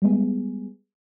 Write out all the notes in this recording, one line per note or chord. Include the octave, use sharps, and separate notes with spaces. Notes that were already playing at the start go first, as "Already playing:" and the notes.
G3 G#3 B3 G#4